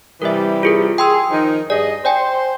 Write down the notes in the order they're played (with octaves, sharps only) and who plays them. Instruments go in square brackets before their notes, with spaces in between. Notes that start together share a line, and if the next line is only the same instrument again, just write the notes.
[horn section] C3 E3 G3 [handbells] A#4 E5
[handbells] F4 G#4 A#4
[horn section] G#4 [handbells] G5 C6 E6
[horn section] D#3 F3 D#4
[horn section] G2 G#4 D#5 [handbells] D5
[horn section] C5 [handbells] D5 G5 G#5